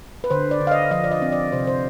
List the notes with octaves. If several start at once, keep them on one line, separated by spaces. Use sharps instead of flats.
B4
D3 C5
D5
D3
F5
D#5
F3 D#5
D5
D#5
C4
D5
C3 C5
C5